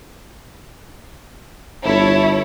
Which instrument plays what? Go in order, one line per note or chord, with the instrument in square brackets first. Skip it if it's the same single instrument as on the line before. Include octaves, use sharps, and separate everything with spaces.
[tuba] G1 [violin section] E4 A4 C#5